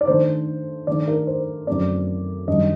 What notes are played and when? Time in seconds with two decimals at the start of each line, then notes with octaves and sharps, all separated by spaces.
0.01 D5
0.07 D#3 A3 D4 C5
0.87 D#3 A3 D4 D5
1.08 A#4
1.27 C5
1.67 F#2 D3 F#3 A3 C4 D5
2.47 F#2 D#3 G3 D4 D#5